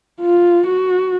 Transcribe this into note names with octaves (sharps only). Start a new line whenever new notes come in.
F4
F#4